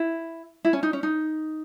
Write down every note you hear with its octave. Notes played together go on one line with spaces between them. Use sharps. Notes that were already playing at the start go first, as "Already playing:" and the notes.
Already playing: E4
E4
C#4
D#4
C#4
D#4